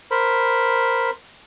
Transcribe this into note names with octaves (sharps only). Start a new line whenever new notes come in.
A#4 C5 B5